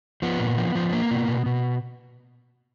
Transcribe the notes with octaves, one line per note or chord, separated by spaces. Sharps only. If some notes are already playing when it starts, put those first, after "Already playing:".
F3 B3
A#2
F3
F3
A#3
B2
B2
B2